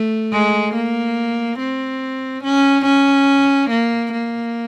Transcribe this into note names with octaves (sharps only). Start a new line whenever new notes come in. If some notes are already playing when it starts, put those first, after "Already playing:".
Already playing: A3
G#3
A#3
C4
C#4
C#4
A#3
A#3